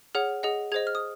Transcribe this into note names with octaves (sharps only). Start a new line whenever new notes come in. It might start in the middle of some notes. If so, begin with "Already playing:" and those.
G#4 C#5 F#5 F6
G#4 D#5 F#5
G#4 C5 D#5 G#6
F6
D#6